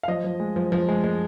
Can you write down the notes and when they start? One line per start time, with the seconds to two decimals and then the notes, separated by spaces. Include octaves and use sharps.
0.03 F5
0.08 F3 D#5
0.24 F3
0.40 G#3
0.56 F3
0.72 F3
0.89 G#3
1.04 G#3